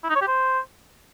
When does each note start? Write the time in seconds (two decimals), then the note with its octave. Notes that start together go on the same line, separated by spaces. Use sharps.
0.04 E4
0.10 D#4
0.16 C#5
0.22 G4
0.28 C5